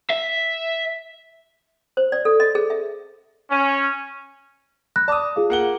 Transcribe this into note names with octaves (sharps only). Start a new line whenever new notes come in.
E5
C5
D5
A4
D#5
G#4
E5
C#4
B5 F#6 A#6
D5 A5 D6 D#6
F4 G#4 F5
A#3 F#5 G7